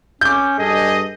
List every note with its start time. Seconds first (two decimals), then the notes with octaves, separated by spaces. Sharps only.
0.21 C#4 D6 G6
0.59 G2 G#4 A4 D#5